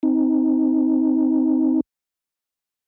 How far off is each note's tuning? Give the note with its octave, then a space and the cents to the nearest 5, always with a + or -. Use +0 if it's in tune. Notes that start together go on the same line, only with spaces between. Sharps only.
C4 +0 D#4 +15